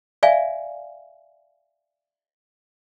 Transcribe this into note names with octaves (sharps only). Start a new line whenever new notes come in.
D5 E5 F5 G#5